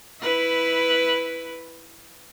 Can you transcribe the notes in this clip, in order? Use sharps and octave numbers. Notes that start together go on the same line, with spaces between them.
E4 B4